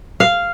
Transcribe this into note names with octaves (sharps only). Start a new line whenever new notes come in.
F5